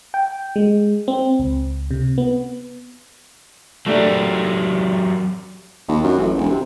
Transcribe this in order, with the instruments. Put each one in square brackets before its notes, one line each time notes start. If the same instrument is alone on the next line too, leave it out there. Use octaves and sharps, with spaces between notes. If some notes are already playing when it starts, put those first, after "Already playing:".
[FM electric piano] G5
G#3
C4
C#2
C3
B3
[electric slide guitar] F#3 G4 A#4 [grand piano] A3 D4
[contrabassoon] D#2
F#2
A1
E1
C3